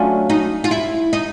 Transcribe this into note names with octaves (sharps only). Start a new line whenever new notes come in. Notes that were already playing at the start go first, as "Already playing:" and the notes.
Already playing: F#3 A3 C#4 D4 F4
D#4
F4
E4
D#4